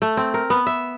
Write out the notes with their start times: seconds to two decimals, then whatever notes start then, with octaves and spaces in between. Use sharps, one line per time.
0.02 A3
0.17 C4
0.34 A#4
0.50 B3
0.67 E5